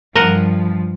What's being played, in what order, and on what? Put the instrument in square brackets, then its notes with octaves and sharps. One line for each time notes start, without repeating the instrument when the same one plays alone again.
[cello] G2 F3 [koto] A#4 D#5 F#5